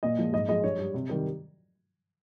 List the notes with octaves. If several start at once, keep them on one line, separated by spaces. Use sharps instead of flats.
A#2 D#5
F3 G#3
G#2 D#5
F3 G#3 D#5
G2 C#5
G3
C3
D#3 G3